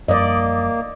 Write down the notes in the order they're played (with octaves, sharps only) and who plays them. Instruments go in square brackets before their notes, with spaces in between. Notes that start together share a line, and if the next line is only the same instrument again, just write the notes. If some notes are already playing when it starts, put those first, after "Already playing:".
[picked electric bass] F#2 F3 G3 [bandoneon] A#3 [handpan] D5 D#5